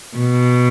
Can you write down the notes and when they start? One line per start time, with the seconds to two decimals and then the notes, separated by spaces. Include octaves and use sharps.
0.17 B2